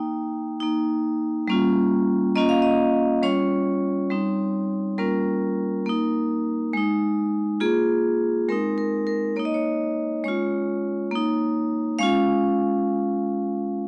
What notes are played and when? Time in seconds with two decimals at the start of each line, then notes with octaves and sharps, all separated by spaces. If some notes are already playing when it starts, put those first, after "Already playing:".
Already playing: A#3 D#4 G5
0.60 A#3 D#4
1.48 G3 A#3 C#4 F4
2.36 A#3 C#4 F4 D#5
2.49 F5
2.62 D#5
3.23 G3 C#4 F4 C#5
4.10 G3 C4 D#4
4.98 G3 A#3 C#4 F4 A#4
5.86 A#3 D#4
6.73 G#3 D#4
7.61 A#3 F4 G#4
8.49 G#3 C4 D#4 A#4
8.78 A#4
9.07 A#4
9.36 A#3 D#4 C#5
9.45 D#5
9.54 C#5
10.24 G#3 C#4 F4 C#5
11.11 A#3 D#4
11.99 G#3 C#4 F4 F5